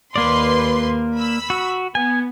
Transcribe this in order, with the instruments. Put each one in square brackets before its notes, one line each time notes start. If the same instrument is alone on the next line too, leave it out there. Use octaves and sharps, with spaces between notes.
[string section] D#2 B4 C6 [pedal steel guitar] A#3 D5
[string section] B5 E6
[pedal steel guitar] F#4
[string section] B3 [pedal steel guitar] G#5